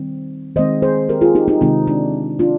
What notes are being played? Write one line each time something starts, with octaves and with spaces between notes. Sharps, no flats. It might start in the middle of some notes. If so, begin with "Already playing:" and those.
Already playing: D#3 G3 C4
D#3 G#3 C4 C5 D#5
G#4 C5
G4 A#4
F4 G#4
D#4 G4
D#4 G4
C3 D#3 G#3 C4 D#4
D4
D4 F4